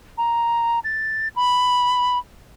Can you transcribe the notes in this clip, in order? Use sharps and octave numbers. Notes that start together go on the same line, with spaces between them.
A#5
A6
B5